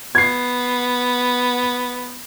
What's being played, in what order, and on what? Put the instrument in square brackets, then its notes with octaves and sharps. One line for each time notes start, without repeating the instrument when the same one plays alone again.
[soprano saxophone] B3 [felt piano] G#6 C7